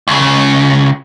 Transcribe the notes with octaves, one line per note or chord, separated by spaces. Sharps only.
C#2 C#3